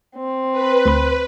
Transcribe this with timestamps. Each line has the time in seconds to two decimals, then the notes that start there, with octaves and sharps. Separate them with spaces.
0.17 C4
0.52 B4
0.86 D2 B5